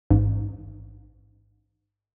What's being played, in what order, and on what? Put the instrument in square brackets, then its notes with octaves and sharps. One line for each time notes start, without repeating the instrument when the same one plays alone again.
[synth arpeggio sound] A1 G#2